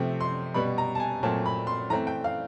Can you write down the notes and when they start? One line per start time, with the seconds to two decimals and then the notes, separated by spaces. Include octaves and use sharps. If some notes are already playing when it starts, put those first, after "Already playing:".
Already playing: C3 F3 A3 C4 G5
0.21 C6
0.54 B2 G3 B3 B5
0.78 A#5
0.95 A5
1.00 G#5
1.23 A#2 F#3 A3 C4 A5
1.46 B5
1.67 C6
1.90 E3 A3 C4 A#5
2.07 G5
2.24 F5